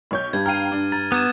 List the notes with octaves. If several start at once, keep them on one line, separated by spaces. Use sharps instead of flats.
B1 C#5 G6
G2 G3 G#6
F5 G5 A#5 F6 D#7
D4
A#5 A6
B3 D6 G#6 E7